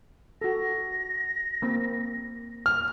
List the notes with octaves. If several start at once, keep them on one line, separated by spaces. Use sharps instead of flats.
F#4 A4 A#6
A#3 C4
F6